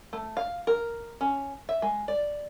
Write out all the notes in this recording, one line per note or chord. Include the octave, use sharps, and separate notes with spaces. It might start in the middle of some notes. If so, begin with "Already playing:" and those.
A3
F5
A#4
C#4
E5
G#3
D5